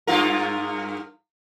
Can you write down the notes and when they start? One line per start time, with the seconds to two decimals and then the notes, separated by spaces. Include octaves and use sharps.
0.07 G2 F4 A#4